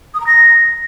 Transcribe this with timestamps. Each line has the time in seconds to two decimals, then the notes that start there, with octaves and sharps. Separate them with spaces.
0.14 D#6
0.21 A#5
0.27 A#6